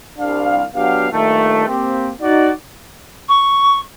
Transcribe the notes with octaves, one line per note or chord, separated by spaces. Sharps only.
C2 D4 F5
F#3 B3 D4 G4 F5
G2 A#2 D#3 A3
A#3 C4 G4
D#4 F#4 D5
C#6